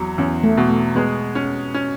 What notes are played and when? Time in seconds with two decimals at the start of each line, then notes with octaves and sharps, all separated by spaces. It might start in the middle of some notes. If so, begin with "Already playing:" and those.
Already playing: E2 F#3
0.18 E2 C#4
0.44 A3
0.57 B2
0.70 A3
0.96 G#3 B3
1.35 C#4
1.74 C#4